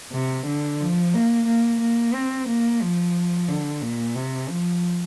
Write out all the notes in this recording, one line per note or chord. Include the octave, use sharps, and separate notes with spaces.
C3
D3
F3
A#3
A#3
A#3
C4
A#3
F3
D3
A#2
C3
F3